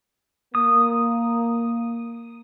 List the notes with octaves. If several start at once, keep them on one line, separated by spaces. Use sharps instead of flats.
A#3 D#6